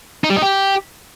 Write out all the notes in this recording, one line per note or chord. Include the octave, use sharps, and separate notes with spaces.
D#4
G3
D#4
G4